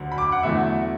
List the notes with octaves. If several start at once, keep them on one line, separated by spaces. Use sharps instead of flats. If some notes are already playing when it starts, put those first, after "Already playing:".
Already playing: D2 D3 F#3
B5
D6
F#5
E2 D3 F#3 A3 E4 E5